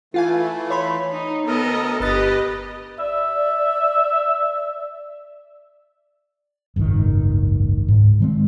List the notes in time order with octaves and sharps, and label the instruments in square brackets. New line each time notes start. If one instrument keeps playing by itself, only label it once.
[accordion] E3 A3 [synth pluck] F4 F5 G#5
[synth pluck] C#5 B5 C6
[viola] D#4
[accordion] D2 A4 A#4 [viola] B3 D#5
[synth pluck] G1 A6 [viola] G4 D#5 [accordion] B4
[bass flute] D5 [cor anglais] E5
[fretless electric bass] F#1 C#2 G#2 D#3
G#2
D#3 G#3 C4